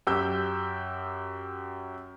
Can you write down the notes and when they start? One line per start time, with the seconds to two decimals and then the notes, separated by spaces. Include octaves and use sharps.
0.07 F#2 G4 E6 G6